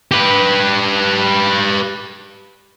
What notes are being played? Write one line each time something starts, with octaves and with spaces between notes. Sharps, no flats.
G4 B4